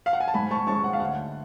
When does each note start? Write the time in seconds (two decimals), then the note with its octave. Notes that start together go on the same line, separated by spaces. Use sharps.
0.06 F5
0.13 F#5
0.20 G#5
0.28 A5
0.34 G#2 G#5 B5
0.51 A5 C#6
0.67 G#3 C#4 A5 C#6
0.84 F#5
0.93 F5
1.00 D2 F#5